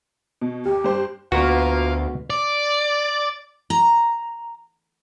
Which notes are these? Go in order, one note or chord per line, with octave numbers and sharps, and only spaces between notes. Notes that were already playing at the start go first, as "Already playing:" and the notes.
B2
D#2 G4
G2 C5
D2 A#3 B3 F4 F#4 F5
D5
A#5